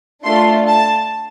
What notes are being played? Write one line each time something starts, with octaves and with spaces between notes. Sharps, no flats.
A3 D4 F4 A4 C6
A5